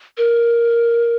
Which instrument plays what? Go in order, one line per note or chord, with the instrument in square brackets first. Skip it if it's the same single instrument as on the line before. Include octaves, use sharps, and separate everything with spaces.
[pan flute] A#4